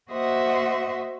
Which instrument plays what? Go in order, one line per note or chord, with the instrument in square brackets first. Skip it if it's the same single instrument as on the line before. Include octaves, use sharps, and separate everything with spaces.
[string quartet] A#3 F#4 C5 D#5 E5 F#5